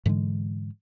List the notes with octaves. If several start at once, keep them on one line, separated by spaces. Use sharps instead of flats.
G#2 D3 E3 G#3